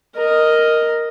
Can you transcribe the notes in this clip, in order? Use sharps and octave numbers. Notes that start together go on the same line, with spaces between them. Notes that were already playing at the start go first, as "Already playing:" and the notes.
A#4 D#5